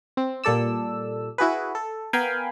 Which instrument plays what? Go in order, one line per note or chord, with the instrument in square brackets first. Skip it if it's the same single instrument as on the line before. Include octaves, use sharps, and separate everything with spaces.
[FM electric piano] C4
A#2 G3 A4 D5 E6
E4 F#4 G#4 B4
A4
B3 A#4 F5 G5 G#5 B5